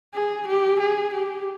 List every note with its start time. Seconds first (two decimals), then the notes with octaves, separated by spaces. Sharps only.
0.14 G#4
0.48 G4
0.80 G#4
1.14 G4